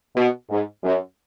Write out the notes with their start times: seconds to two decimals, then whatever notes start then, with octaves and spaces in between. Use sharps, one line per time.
0.16 B2
0.50 G#2
0.84 F#2